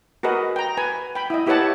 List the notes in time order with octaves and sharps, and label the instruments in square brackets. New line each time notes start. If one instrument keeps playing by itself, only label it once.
[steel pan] F#4 G#4 A#4 B4 D#5
G5 A#5
B4 G#5
G5 B5
E4 D#5
E4 G4 B4 C#5 F#5 A5